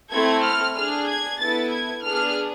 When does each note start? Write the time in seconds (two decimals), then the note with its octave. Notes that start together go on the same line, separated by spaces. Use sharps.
0.11 A3 C4 E4 A4 G#6
0.43 F6
0.75 D4 G#4 F6
1.07 G#6
1.39 B3 E4 A4 A6
1.71 G#6
2.03 B3 D4 G#4 F6